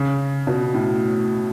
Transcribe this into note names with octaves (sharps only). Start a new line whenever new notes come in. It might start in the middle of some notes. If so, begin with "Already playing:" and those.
Already playing: C#3
B2
A2